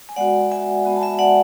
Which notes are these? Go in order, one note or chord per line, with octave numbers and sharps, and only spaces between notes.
G#5
G#3 B3 F#4 D5 F#5
E5 G#5
G#3 B3 F#4
A5
E5 G#5
D5 F#5